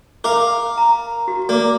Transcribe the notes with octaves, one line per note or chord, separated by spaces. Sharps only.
A#4 F5 D6
A#5
F#4
A#3 D5 D6